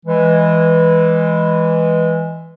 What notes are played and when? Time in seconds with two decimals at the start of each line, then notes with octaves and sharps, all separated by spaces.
0.06 E3 G#3